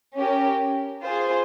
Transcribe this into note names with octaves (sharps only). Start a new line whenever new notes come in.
C#4 G4 A#4
F4 G#4 C5